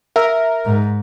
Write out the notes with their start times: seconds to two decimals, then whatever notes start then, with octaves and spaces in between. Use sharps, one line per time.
0.16 A#4 E5
0.65 G#2